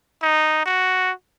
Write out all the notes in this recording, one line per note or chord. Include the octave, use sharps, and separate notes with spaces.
D#4
F#4